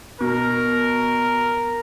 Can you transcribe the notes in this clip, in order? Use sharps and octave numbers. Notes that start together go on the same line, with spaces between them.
B2 A#4